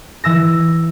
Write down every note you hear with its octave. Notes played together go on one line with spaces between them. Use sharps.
E3 E6 A#6